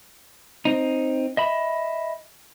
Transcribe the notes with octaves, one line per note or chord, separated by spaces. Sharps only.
C4 D#4
D#5 E5 B5